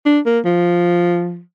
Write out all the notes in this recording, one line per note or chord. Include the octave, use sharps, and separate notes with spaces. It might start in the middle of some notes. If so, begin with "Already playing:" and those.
D4
A#3
F3